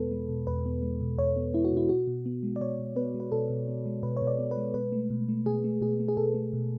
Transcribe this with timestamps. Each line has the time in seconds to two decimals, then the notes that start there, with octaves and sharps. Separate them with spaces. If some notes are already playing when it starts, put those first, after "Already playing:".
Already playing: E2 B2 G#3 B3 A4 B4
0.11 G#3
0.29 B2
0.47 E2 B4
0.66 B3
0.82 G#3
1.01 B2
1.18 E2 C#5
1.36 B3
1.54 G#3 E4
1.65 F#4
1.72 B2 E4
1.89 B2 F#4
2.07 B2
2.26 B3
2.43 G#3
2.56 D5
2.61 B2 C#5
2.79 B2
2.96 B3 B4
3.14 G#3
3.20 B4
3.32 B2 A4
3.50 B2
3.67 B3
3.86 G#3
4.03 B2 B4
4.17 C#5
4.22 B2
4.27 D5
4.39 B3
4.51 B4
4.57 G#3
4.74 B2 B4
4.92 A3
5.10 B2
5.29 A3
5.46 B2 G#4
5.64 A3
5.81 B2 G#4
6.00 A3
6.08 G#4
6.17 B2 A4
6.34 A3
6.53 B2